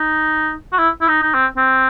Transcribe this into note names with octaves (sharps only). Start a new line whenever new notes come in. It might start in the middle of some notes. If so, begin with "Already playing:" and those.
Already playing: D#4
F#4
E4
E4
D#4
D#4
C4
C4